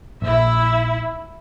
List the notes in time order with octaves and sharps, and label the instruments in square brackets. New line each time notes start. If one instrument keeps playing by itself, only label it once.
[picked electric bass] A#1 [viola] E4 E5